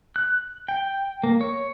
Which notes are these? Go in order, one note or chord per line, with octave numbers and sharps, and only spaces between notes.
F#6
G5
A#3
C#5